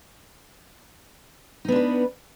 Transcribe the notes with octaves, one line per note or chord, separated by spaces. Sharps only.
B3 D4 D#4 B4